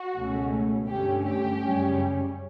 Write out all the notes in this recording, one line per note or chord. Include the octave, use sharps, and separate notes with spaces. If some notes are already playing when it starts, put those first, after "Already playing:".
Already playing: F#4
C#2 B2 A3 C#4
G2 D3 A3 C#4 G4
G4
F#2 C#3 G3 C#4